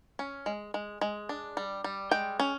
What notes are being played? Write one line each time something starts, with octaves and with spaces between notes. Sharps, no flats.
C#4
G#3
G#3
G#3
D4
G3
G3
G#3 G5
C#4